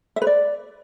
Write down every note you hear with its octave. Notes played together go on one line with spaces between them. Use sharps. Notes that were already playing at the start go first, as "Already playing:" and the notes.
E5
B4
D5